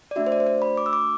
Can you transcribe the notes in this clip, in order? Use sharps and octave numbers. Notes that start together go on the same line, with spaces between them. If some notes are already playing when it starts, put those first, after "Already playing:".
D5
A3 D4 F#4 E5
C5
D5
C5
D5
B5
D6
E6
D6